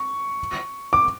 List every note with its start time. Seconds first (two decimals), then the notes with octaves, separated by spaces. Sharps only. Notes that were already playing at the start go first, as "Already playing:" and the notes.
Already playing: C#6
0.93 D6